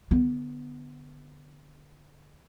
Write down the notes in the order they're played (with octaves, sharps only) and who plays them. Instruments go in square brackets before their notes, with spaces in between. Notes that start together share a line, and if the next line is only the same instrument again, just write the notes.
[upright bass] D3 B3